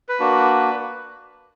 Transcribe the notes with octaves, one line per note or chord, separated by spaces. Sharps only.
B4
A#3 D4 F#4